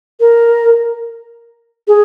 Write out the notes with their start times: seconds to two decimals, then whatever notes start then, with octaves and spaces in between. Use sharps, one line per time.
0.20 A#4
1.88 G#4